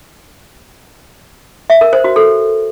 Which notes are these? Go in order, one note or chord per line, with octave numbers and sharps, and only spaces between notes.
E5
A#4
C5
F#4
A4